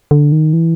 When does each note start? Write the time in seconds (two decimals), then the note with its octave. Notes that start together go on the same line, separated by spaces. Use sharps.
0.11 D3
0.32 D#3
0.53 E3